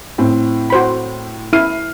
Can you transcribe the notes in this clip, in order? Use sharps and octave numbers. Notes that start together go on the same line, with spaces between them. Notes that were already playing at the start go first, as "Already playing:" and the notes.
A2 C4
F#4 C5 B5
E4 F6 C7 D#7